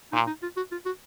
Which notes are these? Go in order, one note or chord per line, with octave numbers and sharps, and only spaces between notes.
A#2 D#4
D#4
F4
F#4
F4
F#4